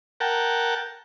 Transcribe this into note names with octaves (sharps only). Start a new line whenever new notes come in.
A#4 F#5 G5 A5